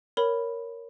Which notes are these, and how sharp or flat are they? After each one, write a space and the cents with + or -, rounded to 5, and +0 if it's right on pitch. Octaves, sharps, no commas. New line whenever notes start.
A#4 +0 C#5 +5 B5 +0